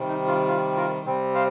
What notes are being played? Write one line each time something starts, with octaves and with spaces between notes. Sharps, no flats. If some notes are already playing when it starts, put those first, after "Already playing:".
Already playing: C3 D#3 G3
D#4
F4
F4
F4 A#4
C3 G3 C4
C5 F5